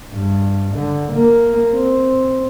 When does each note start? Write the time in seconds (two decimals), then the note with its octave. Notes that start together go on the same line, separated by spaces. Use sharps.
0.12 G2
0.75 D3
1.13 A#3
1.74 C4